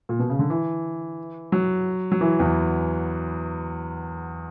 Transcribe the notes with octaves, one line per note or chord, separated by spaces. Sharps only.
A#2
B2
C#3
D3
E3
F#3
F#3
E3
E2